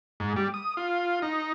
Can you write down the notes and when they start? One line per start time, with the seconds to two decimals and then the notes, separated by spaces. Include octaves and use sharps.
0.20 G#2
0.36 G3
0.54 D#6
0.77 F4
1.22 D#4